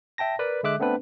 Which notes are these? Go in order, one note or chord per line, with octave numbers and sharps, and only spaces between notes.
E5 G5 A5 A#6
A#4 B4 D5 B5
D3 G#3 E5 D6 F#6
A3 B3 C4 D4 B4